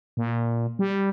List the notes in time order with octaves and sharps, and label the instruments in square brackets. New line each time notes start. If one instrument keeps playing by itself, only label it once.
[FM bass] A#2
G3